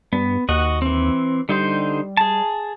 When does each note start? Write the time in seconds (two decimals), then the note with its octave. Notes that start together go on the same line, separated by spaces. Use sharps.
0.13 G2 B3
0.49 D#2 F#4 D#5 F#5
0.82 E3 C4
1.49 D3 G3 D#4 C5
2.17 G#4 A5